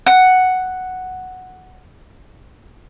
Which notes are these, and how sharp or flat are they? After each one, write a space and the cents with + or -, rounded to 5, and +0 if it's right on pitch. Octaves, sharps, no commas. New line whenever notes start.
F#5 +0